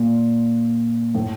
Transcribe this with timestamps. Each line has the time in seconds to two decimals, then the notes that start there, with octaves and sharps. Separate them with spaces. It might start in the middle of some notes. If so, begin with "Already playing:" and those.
Already playing: A#2
1.15 A2